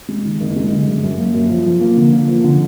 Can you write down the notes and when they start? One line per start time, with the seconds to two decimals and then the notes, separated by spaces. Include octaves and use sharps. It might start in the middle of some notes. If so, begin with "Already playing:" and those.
0.09 G#3
0.25 D#3
0.40 F#1
0.56 G#3
0.72 D3
0.87 F#2
1.03 F#2
1.18 A#3
1.34 F#2
1.50 F3
1.66 F3
1.81 A#3
1.97 D3
2.12 A#3
2.28 F3
2.44 D3